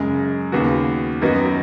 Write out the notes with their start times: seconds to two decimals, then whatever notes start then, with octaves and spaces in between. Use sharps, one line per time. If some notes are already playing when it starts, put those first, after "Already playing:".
Already playing: F#2 C#3 G#3
0.52 D#2 C#3 B3 F#4
1.22 F#2 D#3 B3 D#4 F#4